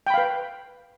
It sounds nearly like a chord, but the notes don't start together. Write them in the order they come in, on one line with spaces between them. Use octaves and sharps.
G5 B5 F5 B4